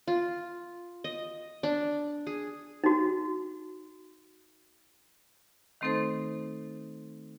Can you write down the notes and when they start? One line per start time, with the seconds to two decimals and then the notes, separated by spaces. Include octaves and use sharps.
0.07 F4
1.04 D#5
1.63 D4
2.27 G#4
2.84 D#4 F#4
5.81 D#3 A3 C4 D#4 A4 C5